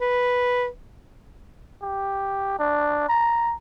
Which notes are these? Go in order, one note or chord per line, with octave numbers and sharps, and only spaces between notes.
B4
G4
D4
A#5